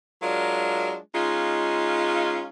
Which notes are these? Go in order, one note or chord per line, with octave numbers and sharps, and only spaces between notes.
F#3 G#3 D4 F4 A#4
G#3 C#4 D#4 F4